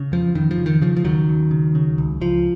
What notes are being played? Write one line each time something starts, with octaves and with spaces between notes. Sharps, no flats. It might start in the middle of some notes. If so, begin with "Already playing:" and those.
Already playing: C#3
F2 F3
F2 D#3
F3
C#3
D#3
C#3 F3
F3
D#2 D#3 F#3
D#2
C#3
C#3
C#2
C#2 F3